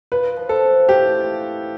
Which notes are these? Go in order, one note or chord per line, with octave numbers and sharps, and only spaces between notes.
F4 B4
F3
A4
C4
A2 G4
F4